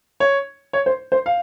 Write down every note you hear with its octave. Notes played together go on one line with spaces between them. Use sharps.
C#5
C#5
C5
C5
F5